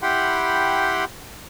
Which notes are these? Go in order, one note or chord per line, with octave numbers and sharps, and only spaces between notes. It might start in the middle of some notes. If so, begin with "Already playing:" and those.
E4 G4 F#5 G5 B5 C6